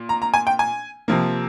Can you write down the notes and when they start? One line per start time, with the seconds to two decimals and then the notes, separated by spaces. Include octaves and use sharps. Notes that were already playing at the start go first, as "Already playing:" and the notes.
Already playing: A#2
0.09 A#5
0.22 A#5
0.34 G#5
0.47 G5
0.59 G#5
1.08 C3 F3 A#3